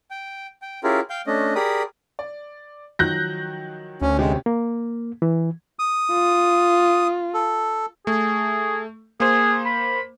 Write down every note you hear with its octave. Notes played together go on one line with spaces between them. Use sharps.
G5
G5
C#4 E4 F4 G4 G#4 A#4
F5 G5 G6
A3 C#4 D4 D#5
G4 G#4 A#4 D5 B5 D#6
D5
D#3 F3 F#3 F#6 G6 A#6
D2 C#4
C3 G#3 C#4 G4
A#3
E3
D#6
F4
A4
A3 G#4
A#3 G#4 C5
B5